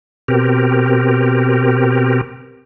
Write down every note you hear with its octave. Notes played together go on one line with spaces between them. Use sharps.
B2 C4 G4 A#4